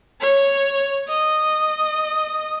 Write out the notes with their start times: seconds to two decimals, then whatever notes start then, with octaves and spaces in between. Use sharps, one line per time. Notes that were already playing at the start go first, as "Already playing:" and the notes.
0.21 C#5
1.08 D#5